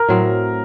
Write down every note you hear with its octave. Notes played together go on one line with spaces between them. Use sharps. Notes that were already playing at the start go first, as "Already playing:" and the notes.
Already playing: A#4
A2 F#3 C4